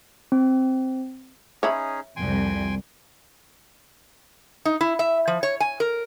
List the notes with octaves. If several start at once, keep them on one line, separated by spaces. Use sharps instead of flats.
C4
C#4 D#4 G#4 C#5 E5 B5
C2 F2 G5 G#5 C6
D#4
E4
E5
F3
C#5
G#5
A#4